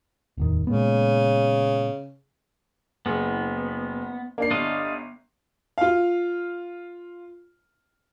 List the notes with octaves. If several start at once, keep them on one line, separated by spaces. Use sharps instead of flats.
D1 E2 D#3
A#2 C#3 G#3 B3
F#1 B3
A#3 D4 C7
G1 D4 D#5 F5
F4 F5